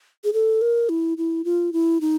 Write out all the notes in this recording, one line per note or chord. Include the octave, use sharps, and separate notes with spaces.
G#4
A4
A#4
E4
E4
F4
E4
D#4